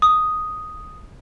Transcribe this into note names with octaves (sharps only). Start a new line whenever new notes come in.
D#6